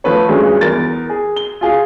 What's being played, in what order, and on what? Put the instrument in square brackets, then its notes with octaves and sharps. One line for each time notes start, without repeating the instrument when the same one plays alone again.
[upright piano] F3 A3 B4 C#5
D2 G2 F3 G#3 C#4
E2 A#4 A6
G#4
G7
F4 G#4 F5